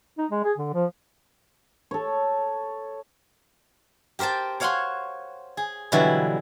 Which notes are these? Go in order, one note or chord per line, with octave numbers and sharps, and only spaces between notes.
D#4
G#3
G#4
D3
F3
A4 C#5
G4 A#4 C5 G5 A5
C5 C#5 F5 F#5 G#5 C6
G#4
B2 D3 E3 F#3 G3 E4